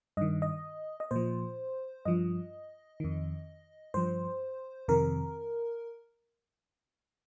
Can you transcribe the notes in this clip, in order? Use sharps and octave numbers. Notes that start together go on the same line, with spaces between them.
G2 D#3 D#5
D#5
D#5
A#2 F3 C5
G2 F3 D#5
F2 D#3
G2 F3 C5
F2 C3 D#3 A#4